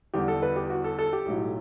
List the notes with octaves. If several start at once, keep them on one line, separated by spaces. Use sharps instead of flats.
E2 D3 G3 G4
A4
B4
G4
F#4
A4
A4
G4
B1 A2 F#3